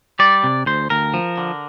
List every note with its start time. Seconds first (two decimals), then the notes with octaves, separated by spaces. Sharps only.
0.19 G3 D5
0.44 C3
0.66 D2 C5
0.90 D2 A#4
1.14 F3
1.38 D3